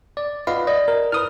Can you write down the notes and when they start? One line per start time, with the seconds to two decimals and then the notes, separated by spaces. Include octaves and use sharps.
0.17 D5
0.47 F4 B4 D#5 F5 F#5
0.67 D5 D#5
0.88 A#4
1.12 E4 B4 D#6 F6